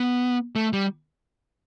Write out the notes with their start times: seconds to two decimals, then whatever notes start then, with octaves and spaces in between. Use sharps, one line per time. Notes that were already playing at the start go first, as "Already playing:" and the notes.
Already playing: B3
0.55 A3
0.73 G3